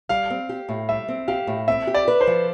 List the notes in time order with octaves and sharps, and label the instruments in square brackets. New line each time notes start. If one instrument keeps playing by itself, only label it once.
[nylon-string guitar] G3 [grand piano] F5
[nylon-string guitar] C4
G4
A2
[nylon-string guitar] G3 [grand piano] E5
[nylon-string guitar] C4
[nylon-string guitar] G4 [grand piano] F5
[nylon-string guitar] A2
[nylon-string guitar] C4 [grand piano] E5
[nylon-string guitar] G4
[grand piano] D5
[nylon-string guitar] B4
[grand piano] C5
[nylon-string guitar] F3